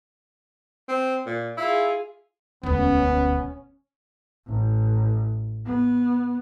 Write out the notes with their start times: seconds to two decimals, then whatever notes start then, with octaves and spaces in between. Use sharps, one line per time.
0.88 C4
1.26 A#2
1.57 E4 F4 G#4
2.63 E1 D2 B3 C#4
4.47 A1
5.66 B3